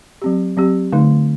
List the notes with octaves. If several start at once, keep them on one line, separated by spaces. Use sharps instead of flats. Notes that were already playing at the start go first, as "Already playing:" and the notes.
F#3 C4 G4
F#3 C4 G4
D3 A3 D#4